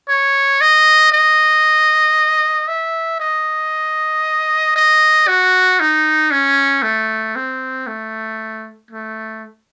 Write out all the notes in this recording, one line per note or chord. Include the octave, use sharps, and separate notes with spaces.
C#5
D#5
D#5
E5
D#5
D#5
F#4
D#4
C#4
A3
C4
A3
A3